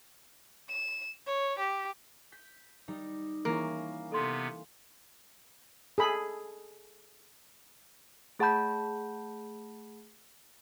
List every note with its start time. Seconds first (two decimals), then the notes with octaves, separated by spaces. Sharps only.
0.69 E7
1.26 C#5
1.58 G4
2.32 G6 B6
2.88 G3 D#4
3.45 E3 A#3 C#4 E4 G#4
4.12 C3 B3 A4 C6
5.98 G#4 A4 B5
8.39 A3 G#4 F#5 A5 B5 G6